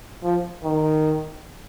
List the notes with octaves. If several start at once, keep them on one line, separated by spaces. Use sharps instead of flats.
F3
D#3